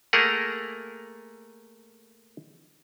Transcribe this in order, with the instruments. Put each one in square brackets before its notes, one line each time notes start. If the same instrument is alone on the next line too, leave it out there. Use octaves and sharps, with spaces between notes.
[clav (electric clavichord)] A3 A#3 G#4 A#4 F#5